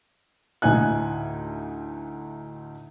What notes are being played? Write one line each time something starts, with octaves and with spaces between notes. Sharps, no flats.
D2 A2 D#4 G#5 F#6